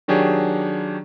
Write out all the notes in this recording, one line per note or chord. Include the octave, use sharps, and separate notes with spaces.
D#3 F#3 D4 G4 G#4 C#5